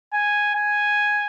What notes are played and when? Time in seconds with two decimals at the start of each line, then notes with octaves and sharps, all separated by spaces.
0.13 G#5
0.55 G#5